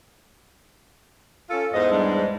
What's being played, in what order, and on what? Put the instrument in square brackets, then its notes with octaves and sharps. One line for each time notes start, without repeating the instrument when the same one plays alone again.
[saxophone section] C#4 F4 A4
[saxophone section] E2 G#2 [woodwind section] D#5
[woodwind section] G3 G#3 D4